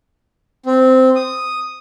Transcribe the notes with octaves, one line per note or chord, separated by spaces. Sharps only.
C4
D#6